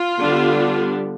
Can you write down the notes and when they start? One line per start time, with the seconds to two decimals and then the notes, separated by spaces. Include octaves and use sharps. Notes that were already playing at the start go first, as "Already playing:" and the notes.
Already playing: F4
0.20 D3 G3 B3 D4